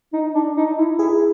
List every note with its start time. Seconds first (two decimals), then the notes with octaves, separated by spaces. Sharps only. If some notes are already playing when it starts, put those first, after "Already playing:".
0.13 D#4
0.35 D4
0.57 D#4
0.78 E4
0.99 E4 G#4